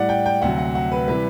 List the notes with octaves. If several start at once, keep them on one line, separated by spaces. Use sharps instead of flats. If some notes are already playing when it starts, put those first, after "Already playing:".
Already playing: A2 G3 D5 F#5
G5
G5
D2 C3 F#3 F#5
F#5
F#5
B4
C3 E3 G3 B4